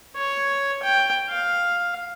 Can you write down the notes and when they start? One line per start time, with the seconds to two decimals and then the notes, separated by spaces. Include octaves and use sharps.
0.16 C#5
0.83 G5
1.30 F5